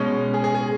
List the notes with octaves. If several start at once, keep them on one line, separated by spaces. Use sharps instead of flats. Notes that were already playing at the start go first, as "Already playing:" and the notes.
Already playing: B2 G#3 C#4
G#4
G#4
G#4